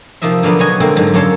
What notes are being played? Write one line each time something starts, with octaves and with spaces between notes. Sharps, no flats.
C3 F3 A#3 D#4 D#5 E5
D3 F#3 A#3 B3 D4
B2 F#3 F#4 C#5 D#5 G#5
D3 G#3 A#3 C4
G#2 D3 F#3
F#2 A#3 A4 C#5 A5 C6